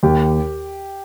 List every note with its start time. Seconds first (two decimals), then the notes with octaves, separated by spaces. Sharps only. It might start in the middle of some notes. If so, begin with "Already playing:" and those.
0.03 D#2 G4